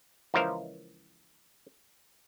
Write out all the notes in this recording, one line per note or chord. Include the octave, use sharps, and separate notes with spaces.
C#2 E3 F3 A#4 C5 F5